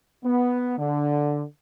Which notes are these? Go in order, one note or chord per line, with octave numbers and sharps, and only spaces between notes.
B3
D3